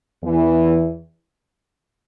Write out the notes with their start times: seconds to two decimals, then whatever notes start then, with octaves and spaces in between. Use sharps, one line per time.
0.24 E2 E3